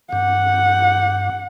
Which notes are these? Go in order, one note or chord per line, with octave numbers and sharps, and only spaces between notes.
G2 F#5